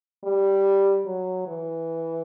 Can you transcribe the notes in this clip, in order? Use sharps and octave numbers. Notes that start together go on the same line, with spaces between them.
G3
F#3
E3